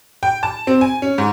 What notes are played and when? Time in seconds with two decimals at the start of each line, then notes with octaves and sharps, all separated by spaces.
0.23 G5
0.43 A5
0.67 C4
0.81 G#5
1.02 C#4
1.18 G#2